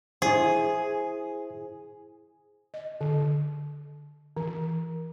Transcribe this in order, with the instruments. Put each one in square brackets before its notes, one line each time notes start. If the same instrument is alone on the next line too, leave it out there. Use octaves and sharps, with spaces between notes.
[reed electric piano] E4 C5 [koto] G#4
[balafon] D#5
D3
E3